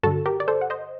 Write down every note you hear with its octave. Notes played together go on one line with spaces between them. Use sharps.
G2 D3 F#4 A4
G4 A#4
D5
A4 C5
F#5
C5 D#5